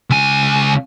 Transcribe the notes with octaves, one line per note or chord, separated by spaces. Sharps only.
C#2 G#5